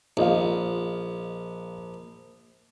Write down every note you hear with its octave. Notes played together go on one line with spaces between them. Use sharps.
A#1 F4 D#5 F5